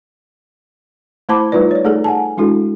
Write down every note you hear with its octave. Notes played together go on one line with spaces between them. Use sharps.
A3 E4 C5 A5 B5 D6
G3 A3 D#4 F4 B4 D5
C#5 D5
A3 D#4 G#4 A4 D5
F#5 G#5 A5
G#3 D4 E4 F#4 A4